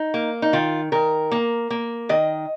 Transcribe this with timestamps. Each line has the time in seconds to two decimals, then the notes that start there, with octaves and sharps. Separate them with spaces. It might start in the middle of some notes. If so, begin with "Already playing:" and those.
Already playing: D#4
0.14 A#3
0.42 D#4
0.53 D#3 F4
0.92 D#3 A#4
1.32 A#3
1.70 A#3
2.09 D#3 D#5